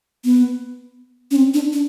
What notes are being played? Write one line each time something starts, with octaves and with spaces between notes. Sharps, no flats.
B3
C#4
C4
D4
D4